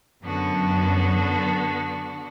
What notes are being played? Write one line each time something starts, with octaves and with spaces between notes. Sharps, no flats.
F#2 D3 B3 F#4 A4